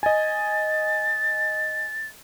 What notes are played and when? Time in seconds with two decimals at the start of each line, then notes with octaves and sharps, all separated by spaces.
0.03 D#5 G#5 A6